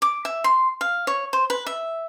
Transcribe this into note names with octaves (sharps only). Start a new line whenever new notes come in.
D6
E5
C6
F5
C#5
C5
B4
E5